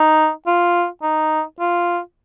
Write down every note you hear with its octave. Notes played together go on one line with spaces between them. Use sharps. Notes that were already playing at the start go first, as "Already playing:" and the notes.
Already playing: D#4
F4
D#4
F4